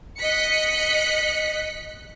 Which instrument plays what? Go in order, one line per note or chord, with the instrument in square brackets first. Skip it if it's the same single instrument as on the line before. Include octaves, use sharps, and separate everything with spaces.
[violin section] D#5 F#6 B6 C#7